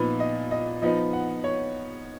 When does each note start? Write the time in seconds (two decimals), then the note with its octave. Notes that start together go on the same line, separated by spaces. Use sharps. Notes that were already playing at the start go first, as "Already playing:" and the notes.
Already playing: A#2 F3 B3 D#4 B4
0.20 D#5
0.51 D#5
0.82 F3 B3 D#4 D#5
1.13 F#5
1.44 C#5